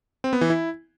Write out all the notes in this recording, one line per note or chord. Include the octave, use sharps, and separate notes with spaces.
C4
B3
E3
E4